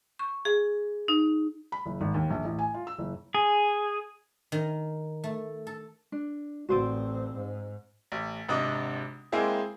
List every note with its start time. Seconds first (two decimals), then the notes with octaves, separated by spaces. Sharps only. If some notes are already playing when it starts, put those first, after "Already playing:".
0.19 C#6
0.45 G#4
1.08 D#4
1.72 B5
1.86 F#1
2.01 G#1
2.14 D#2
2.30 A#1
2.44 A1
2.59 G#5
2.74 F4
2.87 E6
2.98 F#1
3.35 G#4
4.52 D#3
5.24 A3
5.67 A4
6.12 D4
6.69 A1 C4 F#4 C5 D5
7.34 G#2
8.12 A1
8.48 G#1 C3 D4 D#5 D6
9.32 G#3 A#3 C4 E4 G#4